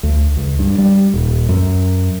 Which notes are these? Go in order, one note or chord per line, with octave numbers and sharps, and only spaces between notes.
D2
C#2
G2
G3
D#1
F#2